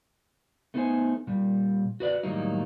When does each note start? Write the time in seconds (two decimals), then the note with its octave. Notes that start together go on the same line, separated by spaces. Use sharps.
0.74 A3 B3 D#4 F#4 C5 G#5
1.27 A#2 G3
2.00 F#4 B4 D5
2.23 A2 D#3 F#3 G3 A#3 D#4